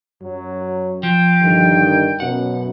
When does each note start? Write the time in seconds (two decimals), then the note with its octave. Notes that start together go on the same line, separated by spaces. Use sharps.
0.22 F#2 F#3
1.03 F3 G5
1.42 G2 D3 D#3
2.20 F#2 B2 F#5